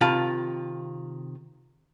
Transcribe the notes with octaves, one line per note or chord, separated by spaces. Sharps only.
C3 D#3 F4 A5 B5